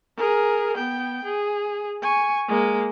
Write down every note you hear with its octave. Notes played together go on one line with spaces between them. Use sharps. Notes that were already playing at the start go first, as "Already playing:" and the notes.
G#4 A#4
B3 G5
G#4
G#5 C#6
G#3 A#3